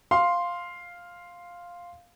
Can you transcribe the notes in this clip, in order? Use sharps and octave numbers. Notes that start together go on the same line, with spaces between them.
F5 C6